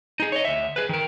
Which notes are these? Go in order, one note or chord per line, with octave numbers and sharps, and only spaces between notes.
D#4 G#4
C#5 D#5
D2 E5
G#4 B4
D#3 A#4